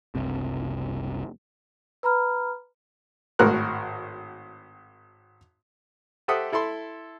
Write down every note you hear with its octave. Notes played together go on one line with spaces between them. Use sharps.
F#1 C2 C3
B4 A#5 B5 F6
G#1 A2 F#4 A#4 F#6
G4 A4 C5 E5 F#5 D#6
E4 A4 B5 C6